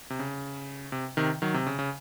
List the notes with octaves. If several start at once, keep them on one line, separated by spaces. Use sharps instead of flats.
C3
C#3
C3
C3 D#3
D#3 F#3
C3
C#3
C#3